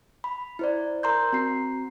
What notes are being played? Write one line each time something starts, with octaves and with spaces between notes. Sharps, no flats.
B5
E4 C5 D5
A#4 A#5 C6 G6
C4 F#4 A#5 C7